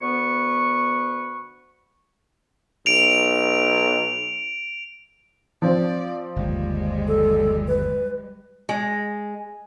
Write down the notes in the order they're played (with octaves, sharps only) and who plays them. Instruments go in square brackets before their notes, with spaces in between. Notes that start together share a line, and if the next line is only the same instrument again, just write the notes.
[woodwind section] D2 B3 B4 C#6
[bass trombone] B1 [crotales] D7 F7
[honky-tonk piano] F3 C4 [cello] D5
[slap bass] G1 D#2 [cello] G3 G#3
[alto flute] A4
B4
[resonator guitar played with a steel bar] G#3